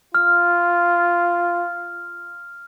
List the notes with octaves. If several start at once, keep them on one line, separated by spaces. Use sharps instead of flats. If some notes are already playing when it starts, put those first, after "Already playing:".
F4 F6